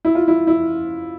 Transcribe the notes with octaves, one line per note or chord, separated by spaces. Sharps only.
E4
F4
E4
E4